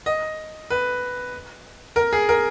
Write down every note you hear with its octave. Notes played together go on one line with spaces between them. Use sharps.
D#5
B4
A#4
G#4
A#4